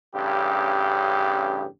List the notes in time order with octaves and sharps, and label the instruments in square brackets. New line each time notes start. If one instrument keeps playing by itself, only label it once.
[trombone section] A1 G2 C#3 G4